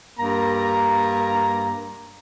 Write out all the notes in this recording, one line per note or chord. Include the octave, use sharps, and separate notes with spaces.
G2 A#3 A#5